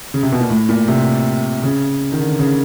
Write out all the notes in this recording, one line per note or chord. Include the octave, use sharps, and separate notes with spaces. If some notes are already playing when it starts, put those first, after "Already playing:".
C#3
C3
B2
A#2
A2
A#2
C3
C#3
D#3
D3
C#3